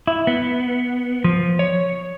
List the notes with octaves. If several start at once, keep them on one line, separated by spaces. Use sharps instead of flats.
E4
B3
F3
C#5